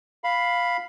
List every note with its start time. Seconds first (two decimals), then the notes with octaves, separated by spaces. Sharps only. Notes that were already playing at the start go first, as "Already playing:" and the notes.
0.24 F5 B5